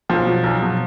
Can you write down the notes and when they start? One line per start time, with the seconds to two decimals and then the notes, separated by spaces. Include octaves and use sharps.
0.09 B1 F3
0.26 B2 F#3
0.44 B1
0.61 B2 F#3